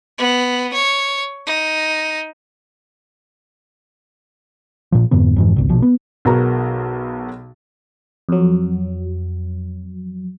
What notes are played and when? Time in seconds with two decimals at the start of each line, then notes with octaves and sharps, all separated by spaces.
0.18 B3
0.73 C#5
1.46 D#4
4.92 A#2 F3
5.11 F2 G#2 D3 B3
5.36 F2 G#2 E3
5.56 G#1 C#2
5.69 A#1 B2 F3
5.82 B3
6.25 B1 B3 F#4 G#4 A#4 A#5
8.29 F2 F#3